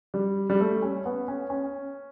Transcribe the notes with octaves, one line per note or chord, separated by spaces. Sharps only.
G3
G3
A3
C#4
B3
C#4
C#4